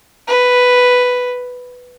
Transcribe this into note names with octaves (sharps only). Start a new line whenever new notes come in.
B4